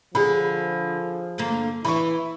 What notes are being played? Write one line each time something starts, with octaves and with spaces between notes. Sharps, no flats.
D3 F3 G#4 B5
G2 D3 A#3
E3 E4 B5 C#6